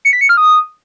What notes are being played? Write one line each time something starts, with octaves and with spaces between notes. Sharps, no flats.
C#7
B6
C#7
F6
D#6